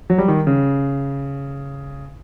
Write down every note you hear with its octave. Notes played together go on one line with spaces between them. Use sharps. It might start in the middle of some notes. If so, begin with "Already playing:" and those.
F#3
G3
D#3
C#3